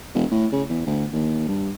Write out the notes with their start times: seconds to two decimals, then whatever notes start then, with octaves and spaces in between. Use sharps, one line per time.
0.15 E1
0.31 A2
0.52 C#3
0.70 E2
0.86 D2
1.13 D#2
1.48 G2